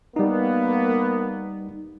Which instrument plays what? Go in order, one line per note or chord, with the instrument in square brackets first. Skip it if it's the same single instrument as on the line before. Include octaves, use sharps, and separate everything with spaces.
[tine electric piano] G3 D#4 [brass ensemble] A#3 B3